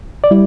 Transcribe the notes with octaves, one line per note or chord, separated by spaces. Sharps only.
D5
G3 E4